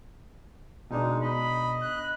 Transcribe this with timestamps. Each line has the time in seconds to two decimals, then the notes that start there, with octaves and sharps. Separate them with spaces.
0.91 B2 G#3 D4 D#4
1.23 D#5 B5
1.82 F#6